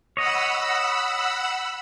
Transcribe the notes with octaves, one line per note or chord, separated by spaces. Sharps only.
C#5 D#5 F#5 B5 E6